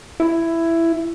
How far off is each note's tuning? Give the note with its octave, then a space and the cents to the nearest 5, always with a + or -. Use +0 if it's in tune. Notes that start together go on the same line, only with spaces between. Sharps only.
E4 +10